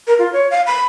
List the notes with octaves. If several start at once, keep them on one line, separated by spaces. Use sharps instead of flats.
A#4
F4
C#5
F5
B5